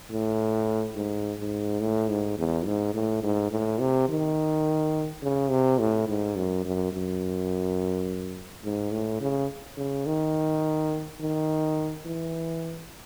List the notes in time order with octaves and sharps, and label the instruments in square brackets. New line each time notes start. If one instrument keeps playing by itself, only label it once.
[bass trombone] A2
G#2
G#2
A2
G#2
E2
G#2
A2
G#2
A2
C3
D#3
C#3
C3
A2
G#2
F#2
F#2
F#2
G#2
A2
C#3
C#3
D#3
D#3
E3